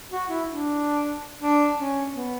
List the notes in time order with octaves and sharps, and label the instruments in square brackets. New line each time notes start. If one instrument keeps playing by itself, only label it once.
[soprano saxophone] F#4
E4
D4
D4
C#4
B3